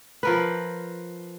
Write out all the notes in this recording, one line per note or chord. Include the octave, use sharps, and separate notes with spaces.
F3 A#4 B4